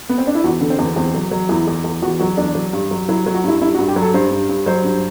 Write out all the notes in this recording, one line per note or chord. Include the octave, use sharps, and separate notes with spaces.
B3
C4
D4
E4
E2 F#4
D3
C4
E2
B3
E2 C4
F#3
F#3
E2 E4
E2
E2
E2 F#4
F#3 F#4
E2 D4
F#3
G2
F#3
F#3 E4
F#3
F#4
G2 E4
G2 E4
F#4
G2
G4
F#3
A4
G2 C5
G2
G2
F#3 C5
G2